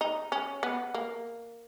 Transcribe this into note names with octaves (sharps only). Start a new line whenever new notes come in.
D#4
C#4
B3
A#3